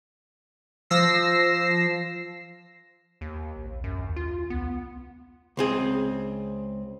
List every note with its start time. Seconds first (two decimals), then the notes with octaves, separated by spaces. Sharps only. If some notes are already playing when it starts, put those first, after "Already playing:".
0.90 F3 E6 A#6 C7
3.21 D#2
3.56 A#1
3.84 F#2
3.96 D#2
4.16 F4
4.50 C2 B3
5.57 C#2 C4 G#4